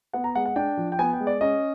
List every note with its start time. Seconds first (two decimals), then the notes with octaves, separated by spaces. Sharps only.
0.13 B3 F#5
0.24 A#5
0.35 G#3 F#5
0.46 F#5
0.56 D4 G5
0.77 F3
0.92 G5
0.99 B3 G#5
1.13 G5
1.20 G#3
1.27 D5
1.41 C#4 D#5